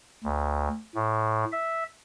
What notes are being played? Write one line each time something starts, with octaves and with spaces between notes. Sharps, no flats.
D2
A2
E5